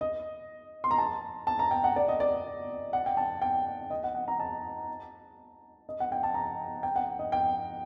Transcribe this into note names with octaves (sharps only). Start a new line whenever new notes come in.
D#5
C6
A#5
A5
A5
A#5
G5
F#5
D5
D#5
D5
F#5
G5
A5
G5
D#5
F#5
F#5
A#5
A5
D#5
F#5
G5
A5
A#5
G5
F#5
D#5
G5